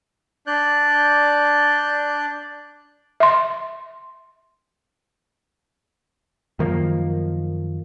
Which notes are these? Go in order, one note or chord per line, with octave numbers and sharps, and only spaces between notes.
D4 D5 F#6 G6
E5 C6
F#2 D#3 F3 A#3